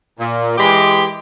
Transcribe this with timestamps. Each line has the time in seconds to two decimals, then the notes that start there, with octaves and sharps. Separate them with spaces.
0.19 A#2
0.58 E3 G#3 G4